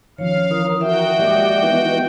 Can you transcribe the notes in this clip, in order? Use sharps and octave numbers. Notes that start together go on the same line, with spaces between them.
D#3 F3 C#4 C#5 F5
E3 A#4 D#6
F#4 E5 G5
G#3 A#3 G4 D5 D#5
E3 B3 D#4